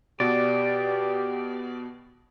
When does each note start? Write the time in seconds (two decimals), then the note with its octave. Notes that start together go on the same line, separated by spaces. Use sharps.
0.20 B2 B3 F#4 G4 D5